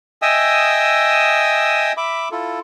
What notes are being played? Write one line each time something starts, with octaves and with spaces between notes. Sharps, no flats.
D#5 E5 G5 G#5 D#6 E6
E5 B5 D6
E4 F4 A4